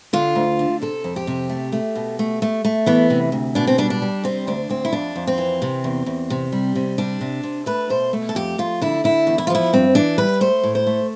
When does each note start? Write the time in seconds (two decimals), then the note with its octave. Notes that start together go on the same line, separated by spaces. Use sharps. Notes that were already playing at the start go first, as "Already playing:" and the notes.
0.13 D3 F4
0.35 D2
0.59 D3
0.82 C3 A4
1.04 F2
1.16 G4
1.27 C3
1.49 A3
1.72 A3
1.95 B2
2.19 A3
2.42 A3
2.65 A3
2.86 E3 B3
3.10 C3
3.32 D2
3.55 B2 D4
3.67 C4
3.78 G3 D4
3.90 D4
4.02 G3
4.24 C3 C4
4.47 D2 D4
4.69 D2 C4
4.85 E4
4.93 F2 D4
5.16 F2
5.27 C4
5.38 E3
5.62 C3
5.84 E2
6.06 E2
6.30 C3
6.52 G3
6.75 C3
6.98 G3 D4
7.21 C3
7.43 C3
7.66 A3 B4
7.90 B2 C5
8.13 A3
8.29 A4
8.35 F2 G4
8.58 F2 F4
8.81 D3 E4
9.04 D3 E4
9.27 E2
9.38 E4
9.47 F4
9.50 F3 E4
9.73 G2 C4
9.95 E3 D4
10.18 G3 B4
10.41 A3 C5
10.64 A2
10.75 C5
10.87 A3